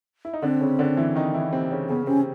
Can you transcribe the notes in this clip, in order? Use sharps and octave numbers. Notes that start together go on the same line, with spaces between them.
E4
D#4
D3 C4 D4
C#3 C#4
D3 D4
E3 E4
D#3 D#4
E3 E4
C3 C4
C#3 C#4
C#3 B3 C#4
C3 C4 C#4